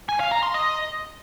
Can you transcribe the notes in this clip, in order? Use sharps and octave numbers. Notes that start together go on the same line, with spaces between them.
G#5
F5
A#5
C6
D#5